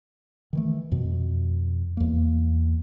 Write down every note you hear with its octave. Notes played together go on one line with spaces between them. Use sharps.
D#3 E3 A3
F2 B2
E2 A#3